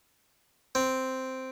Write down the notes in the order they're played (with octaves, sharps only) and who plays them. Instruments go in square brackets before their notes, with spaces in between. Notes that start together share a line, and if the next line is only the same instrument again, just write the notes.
[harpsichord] C4